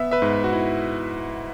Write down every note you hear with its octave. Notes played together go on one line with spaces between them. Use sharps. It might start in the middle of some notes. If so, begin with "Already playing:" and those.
Already playing: B3 E5
B4 E5
G#2
F#4
E4